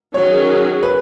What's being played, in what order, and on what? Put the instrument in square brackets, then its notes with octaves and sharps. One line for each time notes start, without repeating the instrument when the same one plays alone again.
[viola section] D#3 F#3 C#4 G#4 [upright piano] C#5
[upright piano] B4